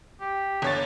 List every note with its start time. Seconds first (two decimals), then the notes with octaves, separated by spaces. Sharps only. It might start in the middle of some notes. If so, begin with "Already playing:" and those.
0.20 G4
0.62 G1 C#5 A6